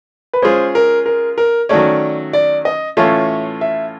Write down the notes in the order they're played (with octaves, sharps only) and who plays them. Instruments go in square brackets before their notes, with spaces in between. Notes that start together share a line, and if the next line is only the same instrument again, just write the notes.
[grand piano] B4
[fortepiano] G#3 C#4 F4 G#4 [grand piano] C5
[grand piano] A#4
A#4
A#4
[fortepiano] D#3 F#3 A3 C#4 [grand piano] D5
[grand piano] D5
D#5
[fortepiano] A2 E3 A3 C#4 F4 [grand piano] E5
[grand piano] E5